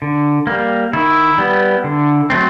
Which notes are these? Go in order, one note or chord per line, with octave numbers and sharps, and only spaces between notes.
D3
G3 A#3
D#3 E4
G3 B3
D3
F#3 A3 C4